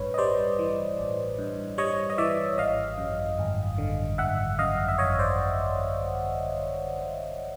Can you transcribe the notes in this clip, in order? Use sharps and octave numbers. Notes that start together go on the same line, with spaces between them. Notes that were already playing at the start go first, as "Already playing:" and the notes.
Already playing: A1 G2 B4 C#5
D#5
G3 C5 D5
E3
A1
G2
G3 C#5 D#5
D#5
E3 D5 E5
G#1 D#5 F5
F#2
G#1
D3
G#1 E5 F#5
F#2 D#5 F5
E5
G#1 C#5 D#5
C5 D5